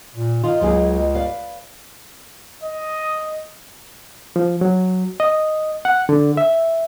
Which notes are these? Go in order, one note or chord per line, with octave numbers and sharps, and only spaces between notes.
A#2
D#3 F4 D#5
C#2 F#3 A#3 G#4
B4 D5 F5
D#5
F3
F#3
D#5
F#5
D3
E5